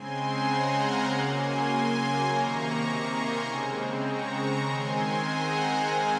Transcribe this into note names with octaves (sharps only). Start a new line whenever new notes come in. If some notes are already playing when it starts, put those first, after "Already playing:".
Already playing: C#3 G#3 C4 G#5 C6
F#5 A#5
F5 G#5
C#3 F#3 A#3 F#5 A#5
G#5 C6
G#5 C6
C3 D#3 A#3 A#5 C#6
G#5 C6
C#3 G#3 C4
A#5 C#6
D#3 G#3 C4 G#5 C6
F#5 A#5
D#3 G#3 C4 F5 G#5